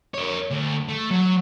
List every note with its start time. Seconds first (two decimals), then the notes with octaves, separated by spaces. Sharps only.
0.14 A#4 C#5
0.50 D2
0.89 A3
1.11 F#3